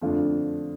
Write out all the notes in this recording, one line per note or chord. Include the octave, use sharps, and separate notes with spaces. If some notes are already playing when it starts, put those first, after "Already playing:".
F2 D3 A3 D4 F4